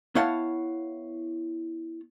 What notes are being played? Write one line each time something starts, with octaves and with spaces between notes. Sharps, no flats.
B3 E4 C#5 F5 F#5 A5